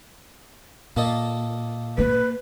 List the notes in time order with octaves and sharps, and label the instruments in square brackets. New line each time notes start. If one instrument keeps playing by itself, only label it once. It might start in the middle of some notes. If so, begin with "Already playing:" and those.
[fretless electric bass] A#2 [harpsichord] A#3 A4 D#5
[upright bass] A#3 [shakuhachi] B4